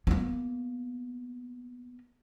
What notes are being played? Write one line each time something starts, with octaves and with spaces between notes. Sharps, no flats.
A#3 B3